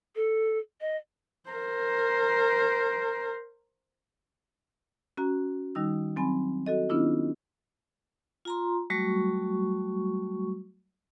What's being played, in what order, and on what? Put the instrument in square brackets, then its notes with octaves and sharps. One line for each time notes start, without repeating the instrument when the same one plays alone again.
[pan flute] A4
D#5
[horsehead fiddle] A#4 C5
[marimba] C#4 F#4 A#5
D#3 G3 D#4 E6
F#3 C4 G#5 B5
F#4 A4 D#5
D#3 B3 C#4 D4 E4 F4
[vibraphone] F4 A#5 C6
F#3 G3 A3 F#4 C#6